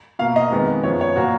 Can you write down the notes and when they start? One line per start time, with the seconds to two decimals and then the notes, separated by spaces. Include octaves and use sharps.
0.19 B2 A#3 F5
0.36 D#5
0.51 F2 D#3 G#3 B3
0.83 F#2 F3 B3 C#5
1.01 C#5
1.16 A#2 F#3 A#3 F#4